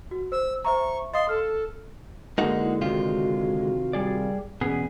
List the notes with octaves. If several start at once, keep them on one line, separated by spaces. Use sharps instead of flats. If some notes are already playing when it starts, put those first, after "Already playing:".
F#4
C5 E6
C5 E5 A#5 C#6
D#5 F5 C6 D#6
A4 F6
D3 G#3 A#3 D#4 F#4
E4
C3 D#3 F4 F#4
G3 G#4 D5
E2 B2 C#4 G#4